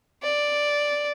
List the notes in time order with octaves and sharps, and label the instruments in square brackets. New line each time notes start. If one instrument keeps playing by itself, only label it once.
[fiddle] D5